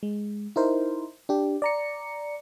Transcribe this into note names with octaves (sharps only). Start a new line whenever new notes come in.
G#3
D#4 E4 A#4 C5
D4 G4
D5 A#5 C#7